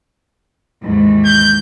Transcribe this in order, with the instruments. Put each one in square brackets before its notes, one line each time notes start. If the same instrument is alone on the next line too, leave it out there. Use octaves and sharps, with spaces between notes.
[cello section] D#2 G#2 E3
[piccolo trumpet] G6